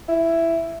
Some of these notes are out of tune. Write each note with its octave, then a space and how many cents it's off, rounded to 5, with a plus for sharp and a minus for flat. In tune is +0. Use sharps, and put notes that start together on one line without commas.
E4 +10